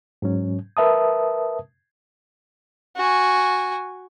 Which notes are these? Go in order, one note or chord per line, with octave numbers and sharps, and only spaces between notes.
G#2 F#3 C#4
A#4 B4 E5 A5 D#6
F#4 G#5